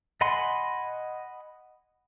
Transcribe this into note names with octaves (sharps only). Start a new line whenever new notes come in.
D#5 F#5 G#5 B5 C6